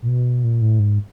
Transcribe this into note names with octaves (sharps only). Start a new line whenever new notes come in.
A#2
B2
A#2
A2
G#2